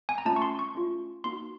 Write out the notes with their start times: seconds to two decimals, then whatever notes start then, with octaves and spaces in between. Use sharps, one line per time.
0.09 G#5
0.18 A#5
0.25 A3 C#4 F4 A5
0.36 C#6
0.42 C6
0.59 C#6
0.75 A3 C#4 F4
1.24 A#3 D#4 F#4 C6